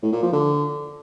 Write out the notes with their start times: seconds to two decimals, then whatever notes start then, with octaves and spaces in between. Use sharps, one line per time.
0.03 A2
0.13 A#2
0.22 F3
0.32 D3